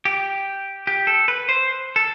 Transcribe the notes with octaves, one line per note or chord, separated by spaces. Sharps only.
G4
G4
A4
B4
C5
A4